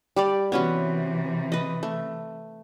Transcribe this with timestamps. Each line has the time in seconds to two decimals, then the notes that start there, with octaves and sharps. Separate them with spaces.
0.16 G3 G4 D5
0.52 C3 E3 B3 C#4 F#4
1.52 B4 D#5
1.83 A3